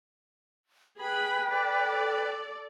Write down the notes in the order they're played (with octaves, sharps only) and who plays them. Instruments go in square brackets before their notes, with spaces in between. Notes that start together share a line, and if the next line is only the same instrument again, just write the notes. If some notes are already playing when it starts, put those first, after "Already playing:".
[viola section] G#4 B5 [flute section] B4 G5
[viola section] A4 D5